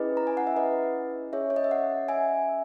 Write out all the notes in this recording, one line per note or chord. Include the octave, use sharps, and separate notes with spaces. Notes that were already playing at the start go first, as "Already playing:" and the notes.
Already playing: C#4 E4 G#4 B4 D#5
A#5
G#5
F#5
E5
B4 D#5
C#4 G#4 C#5 E5
C#5
D#5
E5
D#5 F#5
E5 G#5